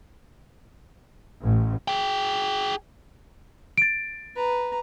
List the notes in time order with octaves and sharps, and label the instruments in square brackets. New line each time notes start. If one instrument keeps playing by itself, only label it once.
[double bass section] A1
[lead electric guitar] G#4 G5
[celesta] A6 D7
[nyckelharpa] B4 A#5